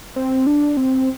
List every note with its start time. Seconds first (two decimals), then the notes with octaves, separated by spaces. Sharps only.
0.16 C4
0.47 D4
0.77 C4